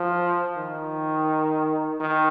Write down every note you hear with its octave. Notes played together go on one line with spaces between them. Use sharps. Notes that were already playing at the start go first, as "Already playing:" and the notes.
Already playing: F3
D#3
D#3